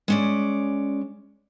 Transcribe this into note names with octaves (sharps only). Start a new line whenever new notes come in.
G#3 C#4 D5